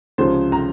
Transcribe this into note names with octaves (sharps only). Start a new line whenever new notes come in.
C#2 C3 F3 G#3 C5
A#5